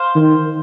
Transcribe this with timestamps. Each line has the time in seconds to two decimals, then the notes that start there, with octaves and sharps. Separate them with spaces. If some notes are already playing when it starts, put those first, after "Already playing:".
Already playing: C5 F5
0.15 D#3